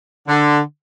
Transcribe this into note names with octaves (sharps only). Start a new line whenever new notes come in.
D3